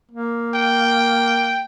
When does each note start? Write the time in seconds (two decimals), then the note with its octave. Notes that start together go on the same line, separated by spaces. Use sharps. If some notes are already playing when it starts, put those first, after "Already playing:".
0.11 A#3
0.55 G5